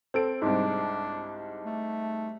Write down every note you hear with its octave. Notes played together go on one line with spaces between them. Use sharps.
C4 A4 D7
C2 G#2 D4
A3